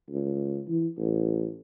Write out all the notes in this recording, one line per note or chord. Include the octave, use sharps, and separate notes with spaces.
C#2
E3
A1